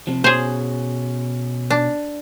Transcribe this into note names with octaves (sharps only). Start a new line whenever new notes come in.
C3 F3
B2 C#4 G#4 C5
D4